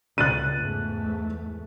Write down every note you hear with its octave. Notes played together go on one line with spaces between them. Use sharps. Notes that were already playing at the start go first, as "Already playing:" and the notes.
C#2 F#6 A6 D#7
E2 G#2 A3